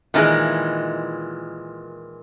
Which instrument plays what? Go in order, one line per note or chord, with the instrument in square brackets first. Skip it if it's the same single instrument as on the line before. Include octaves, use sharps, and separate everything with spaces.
[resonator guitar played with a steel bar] A#2 D#3 E3 G#3